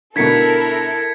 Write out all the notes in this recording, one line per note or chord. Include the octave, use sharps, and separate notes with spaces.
B2 D3 E4 A4 A#4 G#6 B6 C#7